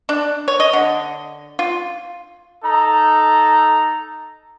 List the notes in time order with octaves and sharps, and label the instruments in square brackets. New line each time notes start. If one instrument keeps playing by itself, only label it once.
[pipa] D4
C#5
D#5
D3
F4
[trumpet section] D#4 A4 A#5